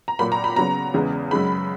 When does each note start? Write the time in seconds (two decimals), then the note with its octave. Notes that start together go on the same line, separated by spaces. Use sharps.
0.08 A#5
0.19 A#2 F#3 A#3 B5
0.32 A#5
0.44 B5
0.56 C#3 F#3 B3 A#5
0.94 E2 C#3 G#3 B3
1.31 F#2 C#3 G#3 B5